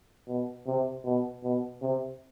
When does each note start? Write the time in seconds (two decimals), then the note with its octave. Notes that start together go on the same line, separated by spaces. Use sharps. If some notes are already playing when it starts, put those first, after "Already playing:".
0.28 B2
0.67 C3
1.04 B2
1.44 B2
1.82 C3